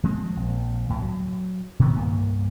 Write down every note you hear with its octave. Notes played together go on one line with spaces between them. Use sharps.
F3 G#3 C4
A#1
C#2 A2
F#3
B2 D#3 E3 B3
C2 G2 A#3